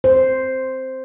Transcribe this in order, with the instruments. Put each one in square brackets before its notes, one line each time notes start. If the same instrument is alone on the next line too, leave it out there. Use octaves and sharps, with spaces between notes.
[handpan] C5